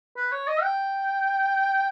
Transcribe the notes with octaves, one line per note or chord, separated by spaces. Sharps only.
B4
C#5
D#5
G5